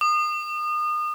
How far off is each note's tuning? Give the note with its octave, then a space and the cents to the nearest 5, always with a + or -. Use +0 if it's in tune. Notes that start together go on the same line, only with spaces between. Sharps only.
D#6 -35